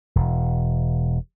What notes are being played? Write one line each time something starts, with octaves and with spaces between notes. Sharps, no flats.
E1